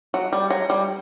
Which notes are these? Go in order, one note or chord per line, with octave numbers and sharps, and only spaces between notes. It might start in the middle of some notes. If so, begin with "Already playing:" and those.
F#3
G3
F#3
G3